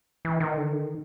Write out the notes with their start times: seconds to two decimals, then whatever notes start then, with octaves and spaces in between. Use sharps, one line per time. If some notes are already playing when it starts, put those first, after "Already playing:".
0.25 E3
0.40 D#3
0.57 D3
0.73 D#3